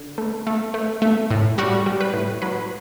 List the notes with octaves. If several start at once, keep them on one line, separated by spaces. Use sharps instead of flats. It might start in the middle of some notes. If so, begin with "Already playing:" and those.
Already playing: D3
A3
A3
A3
A3
A2
G3 F#4
G3
B4
A2
F#3 B4